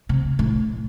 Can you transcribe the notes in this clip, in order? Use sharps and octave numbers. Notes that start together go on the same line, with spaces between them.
C3
A2